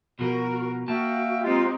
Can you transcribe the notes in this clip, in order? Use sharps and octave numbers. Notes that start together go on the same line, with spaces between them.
B2 F3 F#4 A#4
A#3 F#4 E5 F5 G5 A5
G#3 C4 D#4 F4 G4